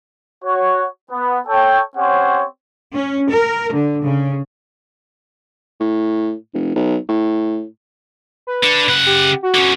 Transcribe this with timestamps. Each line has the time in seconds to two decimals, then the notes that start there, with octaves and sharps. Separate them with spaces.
0.44 F#4 C#5
1.11 B3
1.47 A4 C#5 G5
1.96 C4 C#4 G4 C5 C#5 F#5
2.94 C#4
3.32 A#4
3.74 D3
4.04 C#3
5.80 A2
6.54 F1
6.75 B1
7.09 A2
8.47 B4
8.64 D4 A4
8.88 C#3 F#5
9.06 G4
9.43 F#4
9.54 D3 C#4